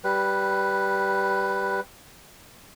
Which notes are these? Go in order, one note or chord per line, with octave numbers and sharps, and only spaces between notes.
G3 B4